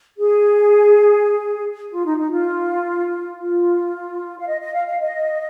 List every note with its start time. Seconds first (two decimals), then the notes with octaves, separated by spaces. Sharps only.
0.17 G#4
1.91 F4
2.05 D#4
2.18 D#4
2.31 F4
3.38 F4
4.39 F5
4.47 D#5
4.60 D#5
4.74 F5
4.86 F5
5.00 D#5